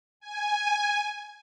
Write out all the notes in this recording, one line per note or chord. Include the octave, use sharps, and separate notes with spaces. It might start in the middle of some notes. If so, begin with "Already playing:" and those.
G#5